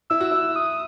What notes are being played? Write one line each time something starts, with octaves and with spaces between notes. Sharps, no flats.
E4 E6
F#4
E4
D#6